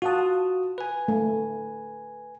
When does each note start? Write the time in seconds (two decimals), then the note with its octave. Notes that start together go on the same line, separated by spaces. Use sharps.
0.02 F4 F#4 F#5 A5 D#6
0.78 B4 G#5
1.08 A3